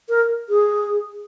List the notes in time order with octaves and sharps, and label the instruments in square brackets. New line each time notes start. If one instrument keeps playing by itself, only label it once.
[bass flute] A#4
G#4